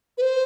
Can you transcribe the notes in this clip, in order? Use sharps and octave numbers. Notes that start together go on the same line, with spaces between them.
B4
C5